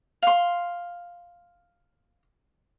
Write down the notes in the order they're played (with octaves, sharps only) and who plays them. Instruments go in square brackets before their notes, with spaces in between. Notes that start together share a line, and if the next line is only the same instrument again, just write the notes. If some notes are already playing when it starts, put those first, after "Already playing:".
[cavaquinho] F5 C6